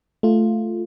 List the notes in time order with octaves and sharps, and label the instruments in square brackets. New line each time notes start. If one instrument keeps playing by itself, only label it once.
[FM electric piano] A3 F4